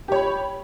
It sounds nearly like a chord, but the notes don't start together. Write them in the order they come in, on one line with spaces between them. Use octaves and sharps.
G4 C#5 B5